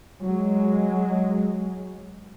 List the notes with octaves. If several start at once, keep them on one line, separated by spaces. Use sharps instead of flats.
F#3 G#3